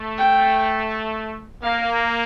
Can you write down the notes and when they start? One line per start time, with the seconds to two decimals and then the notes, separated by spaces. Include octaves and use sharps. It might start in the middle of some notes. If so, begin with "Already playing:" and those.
Already playing: A3
0.18 G5
1.63 A#3 F5